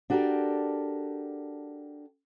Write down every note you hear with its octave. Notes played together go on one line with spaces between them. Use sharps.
D4 F#4 G4 A4 A#4 D5